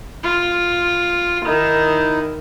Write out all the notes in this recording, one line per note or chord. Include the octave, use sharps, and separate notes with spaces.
F4
D#3 D#4 E4